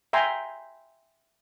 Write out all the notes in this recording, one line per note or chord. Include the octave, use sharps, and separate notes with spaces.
E5 G5 G#5 A#5 C6